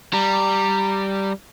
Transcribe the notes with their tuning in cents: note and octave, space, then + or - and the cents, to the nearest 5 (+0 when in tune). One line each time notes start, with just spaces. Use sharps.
G3 -5 A#5 -20